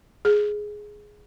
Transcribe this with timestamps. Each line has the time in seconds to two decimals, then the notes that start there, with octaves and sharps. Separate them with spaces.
0.25 G#4